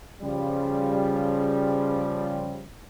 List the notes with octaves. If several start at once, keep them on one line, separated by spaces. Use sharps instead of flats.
C#3 F3 G3